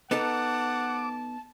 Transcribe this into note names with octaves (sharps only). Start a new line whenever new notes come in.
B3 D#4 A4 F#5 A5 D6